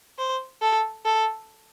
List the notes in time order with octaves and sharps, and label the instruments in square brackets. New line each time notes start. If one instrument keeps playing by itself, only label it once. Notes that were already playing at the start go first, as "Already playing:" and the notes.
[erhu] C5
A4
A4